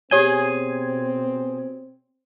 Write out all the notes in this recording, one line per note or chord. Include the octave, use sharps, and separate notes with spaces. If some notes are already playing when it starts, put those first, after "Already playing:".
B2 C4 G4 G#4 C#5 G#5 G7